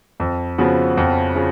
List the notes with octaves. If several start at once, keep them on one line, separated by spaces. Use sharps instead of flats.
F2
C#3 F3 B3 F#4
F2
C#3 F3